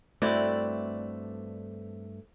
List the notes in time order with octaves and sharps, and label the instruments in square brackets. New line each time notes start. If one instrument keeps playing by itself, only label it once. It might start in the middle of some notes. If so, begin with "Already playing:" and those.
[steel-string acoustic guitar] G2 A3 [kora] C4 E4 F#4 [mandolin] D5